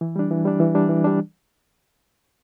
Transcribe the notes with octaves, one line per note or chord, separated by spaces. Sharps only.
E3
G3 D4
E3
G3 D4
E3
G3 D4
E3
G3 D4